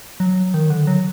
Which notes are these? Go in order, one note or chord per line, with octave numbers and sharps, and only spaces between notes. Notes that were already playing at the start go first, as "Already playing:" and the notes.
F#3
D#3
D3
F#3